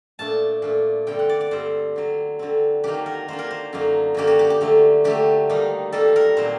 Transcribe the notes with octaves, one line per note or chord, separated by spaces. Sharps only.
A#2 A3 D4 A5
A#2 A3 D4
G2 D3 G3 C4 G5
F#5
D5
D5
G2 D3 G3 C4 C5
D3 F#3 C4
D3 F#3 C4
D#3 F#3 A#3 D4 G4
A#4
D#3 F#3 A#3 D4 C5
A#4
C5
F#2 D3 F#3 A#3 D#4
F#2 D3 F#3 A#3 D#4 G4
F#4
G4
G4
D3 F#3 A3
D3 F#3 A3 G4
D#3 G3 A#3 D#4
D#3 G3 A#3 D#4 A4
A#4
A#2 F#3 C4 C5